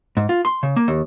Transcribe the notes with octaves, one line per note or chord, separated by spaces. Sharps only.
G#2
F4
C6
C#3
A#3
D#2